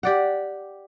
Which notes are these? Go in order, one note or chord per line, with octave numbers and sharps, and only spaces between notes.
G4 D5 F#5